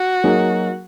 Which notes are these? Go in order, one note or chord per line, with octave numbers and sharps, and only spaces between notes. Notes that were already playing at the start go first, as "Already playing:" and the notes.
Already playing: F#4
F#3 A#3 D#4 G#4